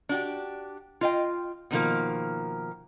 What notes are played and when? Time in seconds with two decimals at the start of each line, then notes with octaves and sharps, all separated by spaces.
0.09 D4 F#4 G4
1.01 F4 D#5 G5
1.71 B2 D#3 F3 A#3